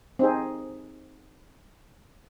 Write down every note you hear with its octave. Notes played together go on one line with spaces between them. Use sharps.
C4 D#4 G#4